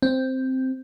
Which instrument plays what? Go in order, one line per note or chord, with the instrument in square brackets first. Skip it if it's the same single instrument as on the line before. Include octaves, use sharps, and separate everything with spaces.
[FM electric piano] C4